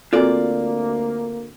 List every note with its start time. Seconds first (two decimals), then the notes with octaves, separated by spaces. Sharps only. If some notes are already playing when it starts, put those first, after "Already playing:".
0.13 D2 A#3 C4 F4 F#4 A4 D5